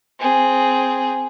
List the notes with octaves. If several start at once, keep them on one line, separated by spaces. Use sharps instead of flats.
C4 G#4